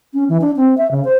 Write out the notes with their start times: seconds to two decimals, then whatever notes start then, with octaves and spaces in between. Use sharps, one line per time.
0.14 C#4
0.29 E3
0.41 D4
0.57 C4
0.77 E5
0.91 C#3
1.05 C5